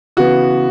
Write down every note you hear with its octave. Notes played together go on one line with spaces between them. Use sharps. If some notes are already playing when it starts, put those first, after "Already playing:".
C#3 E3 B3 F#4